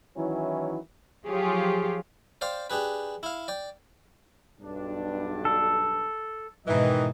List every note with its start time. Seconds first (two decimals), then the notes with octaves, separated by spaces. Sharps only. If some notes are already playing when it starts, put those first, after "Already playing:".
0.17 D#3 E3 F#3 C#4 E4
1.26 F3 F#3 F4 G4 G#4 C#5
2.41 C5 D5 F5 G5 C6
2.70 D4 G4 G#4 B4
3.23 E4 F5
3.48 D5 G5
4.59 B1 G2 D4
5.45 A4
6.66 G#2 B2 D#3 E3 D#5